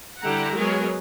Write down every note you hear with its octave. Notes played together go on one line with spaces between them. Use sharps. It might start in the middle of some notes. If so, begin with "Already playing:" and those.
D3 G3 E4 G4 F#5 A#5
F#3 G#3 B3 G#4 A#4 C#5